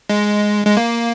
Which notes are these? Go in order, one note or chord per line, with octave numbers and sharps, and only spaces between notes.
G#3
G#3
A#3